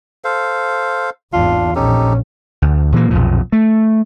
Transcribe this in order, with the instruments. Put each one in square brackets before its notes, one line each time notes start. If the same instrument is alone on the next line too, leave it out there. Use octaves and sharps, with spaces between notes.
[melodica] A4 C5 F5
[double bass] G#1 E2 [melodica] D4 [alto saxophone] F4
[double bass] A#1 [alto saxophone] C#4 [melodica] D#4 G4 A4
[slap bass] D2
A#2 E3 G3 A#3
B1 F2 A#2
A3